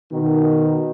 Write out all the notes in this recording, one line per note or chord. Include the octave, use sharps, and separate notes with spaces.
B2 D#3